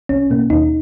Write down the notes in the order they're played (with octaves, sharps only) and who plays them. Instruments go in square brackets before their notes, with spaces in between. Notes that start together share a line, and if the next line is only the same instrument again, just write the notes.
[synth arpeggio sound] B1 C#4
B2 A#3
D#2 D#4